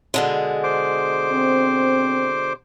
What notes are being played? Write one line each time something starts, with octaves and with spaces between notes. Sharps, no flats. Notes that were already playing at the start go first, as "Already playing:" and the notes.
B2 D3 G#3
C5 D6
C4